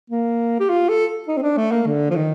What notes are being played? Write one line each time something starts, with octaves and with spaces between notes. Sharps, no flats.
A#3
G4
F4
A4
D#4
C4
D4
A3
A#3
D3
F3
D#3